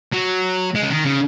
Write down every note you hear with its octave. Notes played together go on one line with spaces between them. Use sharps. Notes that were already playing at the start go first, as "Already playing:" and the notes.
F#3
G#3
C#3
D#3
C#3